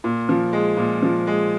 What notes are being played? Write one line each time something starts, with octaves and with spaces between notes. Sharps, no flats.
A#2
F3
G#3
A#2
F3
G#3